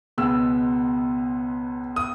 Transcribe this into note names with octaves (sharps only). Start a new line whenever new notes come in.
C#2 B2 G#3 B3 E6
D#6